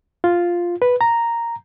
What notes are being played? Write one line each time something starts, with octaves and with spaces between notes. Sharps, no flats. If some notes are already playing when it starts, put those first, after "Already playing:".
F4
B4
A#5